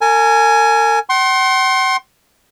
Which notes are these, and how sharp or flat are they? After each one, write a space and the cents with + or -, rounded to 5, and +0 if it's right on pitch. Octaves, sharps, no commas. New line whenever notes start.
A#4 -40 G#5 +10
F#5 +45 C6 +25